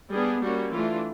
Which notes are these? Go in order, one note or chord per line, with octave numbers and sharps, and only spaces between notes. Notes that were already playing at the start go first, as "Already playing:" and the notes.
G3 B3 D4 G#4
G3 A#3 C#4 F#4
E3 A3 D4 F4